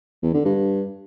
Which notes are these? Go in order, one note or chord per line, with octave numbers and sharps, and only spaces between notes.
E2
D3
G2